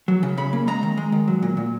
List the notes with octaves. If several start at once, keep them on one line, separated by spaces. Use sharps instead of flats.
F#3
C#3
C#3 B5
A#3
G#3 A#5
D#3
G#3
D#3
F#3
A#2
A#2